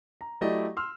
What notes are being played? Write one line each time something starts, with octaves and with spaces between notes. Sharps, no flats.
A#5
F#3 A3 E4 G4 D5 D#5
C6 E6 F6